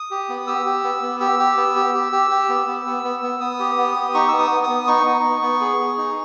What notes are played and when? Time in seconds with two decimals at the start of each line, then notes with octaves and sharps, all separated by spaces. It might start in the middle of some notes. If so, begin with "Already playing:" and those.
Already playing: D#6
0.11 G4
0.29 B3
0.47 G4 E6
0.66 G4
0.84 B3
1.02 B3
1.20 G4 E6
1.39 G4
1.57 B3
1.76 G4
1.94 G4
2.12 G4
2.30 G4
2.49 B3
2.67 B3
2.86 B3
3.04 B3
3.23 B3
3.41 B3 D#6
3.59 G4
3.78 B3
3.96 G4
4.14 D#4 C#6
4.28 B3 E6
4.39 D#6
4.51 B3
4.63 D#6
4.69 B3
4.87 D#4 C#6
5.06 D#4
5.24 B3
5.42 B3
5.61 G#4
5.79 G#4
5.98 D#4